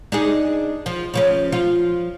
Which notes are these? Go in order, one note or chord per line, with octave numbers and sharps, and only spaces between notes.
D4 D#4 G#4
F3
C#3 F3 C#4
F3 F4